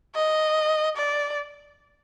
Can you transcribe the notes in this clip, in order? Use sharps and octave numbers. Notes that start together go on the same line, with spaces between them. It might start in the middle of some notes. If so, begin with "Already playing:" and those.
D#5
D5